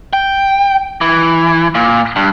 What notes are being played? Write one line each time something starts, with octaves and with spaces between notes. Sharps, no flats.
G5
E3
A#2
G2